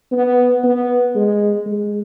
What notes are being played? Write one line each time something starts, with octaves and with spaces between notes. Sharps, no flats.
B3
B3
G#3
G#3